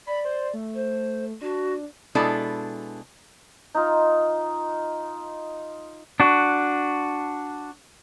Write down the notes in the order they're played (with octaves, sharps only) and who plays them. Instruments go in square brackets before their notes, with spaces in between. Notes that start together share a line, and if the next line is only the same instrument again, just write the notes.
[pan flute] D5 [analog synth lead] B5
[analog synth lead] C5
A3
[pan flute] C5
[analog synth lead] D4 [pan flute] F#4
[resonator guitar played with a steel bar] B2 G#3 D4 E4 A4
[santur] D#4 F4
[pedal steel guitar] D4 F#4